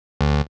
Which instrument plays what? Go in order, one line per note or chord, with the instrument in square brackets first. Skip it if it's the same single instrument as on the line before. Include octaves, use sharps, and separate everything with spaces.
[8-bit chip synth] D2